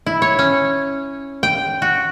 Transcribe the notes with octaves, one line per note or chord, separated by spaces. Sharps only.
E4
C#5
C#4
G5
F#4